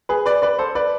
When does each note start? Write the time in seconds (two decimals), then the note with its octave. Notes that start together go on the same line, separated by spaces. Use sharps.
0.09 G#4 B4
0.26 B4 D5
0.42 B4 D5
0.59 A4 C5
0.75 B4 D5